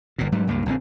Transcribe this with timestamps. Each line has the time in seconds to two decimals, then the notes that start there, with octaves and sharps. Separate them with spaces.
0.18 G1 A#2
0.32 G#2 F#3 G3
0.47 C#2 G2 A3 A#3
0.66 A#1 D3 D#3 C4